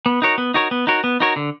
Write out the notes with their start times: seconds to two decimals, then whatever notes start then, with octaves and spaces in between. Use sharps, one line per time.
0.06 B3
0.22 D#4 F#4 A#4 C#5
0.38 B3
0.54 D#4 F#4 A#4 C#5
0.71 B3
0.87 D#4 F#4 A#4 C#5
1.04 B3
1.20 D#4 F#4 A#4 C#5
1.36 D3